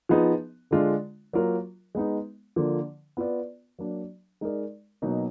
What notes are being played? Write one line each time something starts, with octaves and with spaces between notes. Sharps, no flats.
F3 B3 D#4 G#4
D3 G#3 D4 F4
F#3 A#3 F4 A#4
G#3 B3 D#4
D3 F3 A#3
B3 F4 B4 D5
F#3 A#3 D4
G#3 D#4 A#4 D5
B2 F#3 A#3 D#4